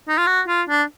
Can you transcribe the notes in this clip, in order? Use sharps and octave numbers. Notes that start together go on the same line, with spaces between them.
D#4
F4
F#4
F4
D4